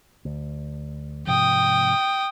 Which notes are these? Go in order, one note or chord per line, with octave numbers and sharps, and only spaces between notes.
D2
G#2 C3 F3 G5 D#6